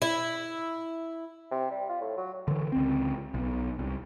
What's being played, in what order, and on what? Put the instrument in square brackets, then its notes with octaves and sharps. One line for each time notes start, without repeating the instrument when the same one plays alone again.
[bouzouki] E4
[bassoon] C3
G3
F4
A2
F#3
[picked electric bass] D3 E3
C#2 C4
B1
C2